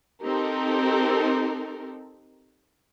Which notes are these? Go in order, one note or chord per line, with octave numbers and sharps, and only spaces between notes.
C4 D#4 G4 A4 A#4